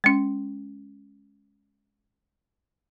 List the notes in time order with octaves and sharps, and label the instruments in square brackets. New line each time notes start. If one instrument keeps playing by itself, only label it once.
[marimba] G#3 C#4